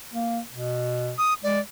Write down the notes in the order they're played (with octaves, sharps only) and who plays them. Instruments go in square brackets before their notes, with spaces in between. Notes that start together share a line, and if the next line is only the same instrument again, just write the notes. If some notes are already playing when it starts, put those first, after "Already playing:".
[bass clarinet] A#3
B2
[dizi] D#6
[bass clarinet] G#3 [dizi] D5